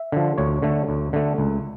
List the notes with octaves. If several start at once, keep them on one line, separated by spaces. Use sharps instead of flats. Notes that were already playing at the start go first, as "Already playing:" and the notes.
Already playing: E5
D3 F3
D2 C#5
D3 A3
D2
D3 A3
C#2